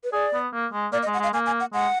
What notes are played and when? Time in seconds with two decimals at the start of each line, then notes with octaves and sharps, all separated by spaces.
0.04 B4
0.13 G#4 D5
0.34 B3
0.53 A#3
0.73 G#3
0.92 A#3 D5
1.03 D#5
1.07 G#3
1.14 F#5
1.19 G#3 F5
1.33 A#3 G#5
1.46 G#5
1.60 F#5
1.73 G#3 F#5